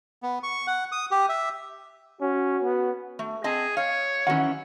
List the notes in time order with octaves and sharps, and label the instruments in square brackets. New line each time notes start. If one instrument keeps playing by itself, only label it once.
[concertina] B3
C#6
F#5
D#6
G4
E5
[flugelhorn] C#4 [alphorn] F#4
[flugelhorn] B3
[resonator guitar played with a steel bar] A3
[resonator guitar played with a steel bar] C4 D#5 A5 [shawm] G#4
[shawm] C#5 [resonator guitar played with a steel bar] F5
[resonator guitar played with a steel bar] D#3 E3 [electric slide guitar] C#4 F#4 F#5